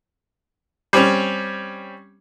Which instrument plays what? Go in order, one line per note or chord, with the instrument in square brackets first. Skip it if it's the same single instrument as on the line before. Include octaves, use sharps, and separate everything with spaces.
[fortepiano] G3 C4 C#4